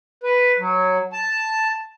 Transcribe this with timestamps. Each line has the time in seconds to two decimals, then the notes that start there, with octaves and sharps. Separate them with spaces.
0.24 B4
0.59 F#3
1.13 A5